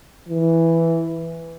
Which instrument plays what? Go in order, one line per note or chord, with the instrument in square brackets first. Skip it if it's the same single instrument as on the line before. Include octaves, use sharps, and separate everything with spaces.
[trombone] E3